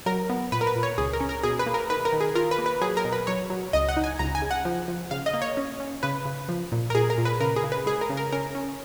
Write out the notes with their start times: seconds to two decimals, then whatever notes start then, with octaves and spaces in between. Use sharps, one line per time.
0.06 F#3 A#4
0.30 B3
0.52 A#2 B4
0.61 A#4
0.67 B4
0.76 A#2
0.83 C#5
0.98 C#2 G#4
1.13 A#4
1.20 C#4
1.29 A#4
1.43 B2 G#4
1.59 B4
1.66 A#3
1.74 A#4
1.90 D#3 B4
2.05 A#4
2.13 D#3
2.21 G#4
2.36 F4 A#4
2.51 B4
2.59 A#3
2.66 B4
2.81 F#3 G#4
2.97 A#4
3.05 B2
3.12 B4
3.27 F#3 C#5
3.50 F#3
3.73 C#2 D#5
3.89 F#5
3.97 D#4
4.04 G#5
4.19 C#2 A#5
4.35 G#5
4.42 C#3
4.51 F#5
4.65 F3
4.88 F3
5.11 C#3 F5
5.26 D#5
5.34 A#3
5.42 C#5
5.57 C#4
5.80 C#4
6.03 C#3 B4
6.25 C#3
6.49 F3
6.72 A#2
6.90 A#4
6.95 A#2 G#4
7.10 A#4
7.18 A#2
7.25 B4
7.40 C#3 A#4
7.56 G#4
7.64 C#3
7.72 B4
7.86 G#3 G#4
8.01 A#4
8.10 C#3
8.17 A#4
8.32 C#4 A#4
8.55 C#4